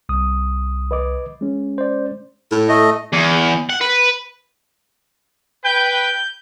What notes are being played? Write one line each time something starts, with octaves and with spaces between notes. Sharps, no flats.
C2 D#6
B4 D#5 D6
G#3 C#4
C5 D5
A2
A3 D#5
E2
F#5
B4
B4 G5 G6